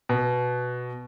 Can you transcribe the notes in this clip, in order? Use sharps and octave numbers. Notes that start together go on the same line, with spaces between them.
B2